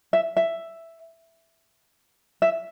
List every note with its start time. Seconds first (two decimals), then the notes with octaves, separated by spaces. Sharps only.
0.13 E5
0.37 E5
2.42 E5